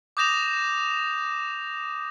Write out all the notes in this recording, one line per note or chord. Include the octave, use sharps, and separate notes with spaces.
D6 D#6 G6 A#6 E7 F7